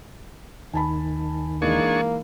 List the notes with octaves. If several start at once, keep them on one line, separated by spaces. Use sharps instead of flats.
D#2 D#3 G#5 A5 B5
E3 G#3 A#3 D4 D#4 G#4 C#6